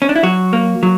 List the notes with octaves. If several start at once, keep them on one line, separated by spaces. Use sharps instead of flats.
C#4
D4
E4
F#3 F#4
A#3
F#3